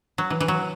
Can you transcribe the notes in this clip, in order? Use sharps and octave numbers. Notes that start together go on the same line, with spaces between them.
F#3
E3
E3
F#3